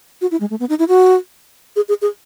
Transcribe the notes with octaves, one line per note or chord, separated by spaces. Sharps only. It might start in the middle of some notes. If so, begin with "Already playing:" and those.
F#4
E4
G#3
A3
B3
D#4
E4
F#4
G#4
G#4
G#4